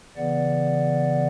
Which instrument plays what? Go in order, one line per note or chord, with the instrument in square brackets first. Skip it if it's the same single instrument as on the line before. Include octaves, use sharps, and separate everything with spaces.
[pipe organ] C#3 E3 B3 D5 F#5